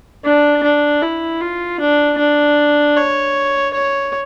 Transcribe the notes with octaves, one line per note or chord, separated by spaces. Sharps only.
D4
D4
E4
F4
D4
D4
C#5
C#5